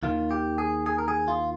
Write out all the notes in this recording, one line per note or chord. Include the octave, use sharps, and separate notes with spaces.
D#2 D#3 F4
G4
G#4
G#4
A#4
G#4
F4